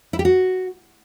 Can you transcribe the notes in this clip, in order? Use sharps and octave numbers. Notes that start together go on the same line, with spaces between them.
E4
G4
F#4